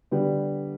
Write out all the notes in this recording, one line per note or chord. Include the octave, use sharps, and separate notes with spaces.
D3 G3 B3